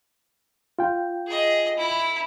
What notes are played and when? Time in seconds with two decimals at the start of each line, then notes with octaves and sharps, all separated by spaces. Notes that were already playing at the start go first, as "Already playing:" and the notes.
0.79 F4 G5
1.27 G#4 D#5
1.77 E4